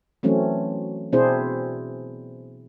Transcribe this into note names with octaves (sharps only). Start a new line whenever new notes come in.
E3 F#3 A3 C4 C#4
B2 C4 D4 E4 G#4 C5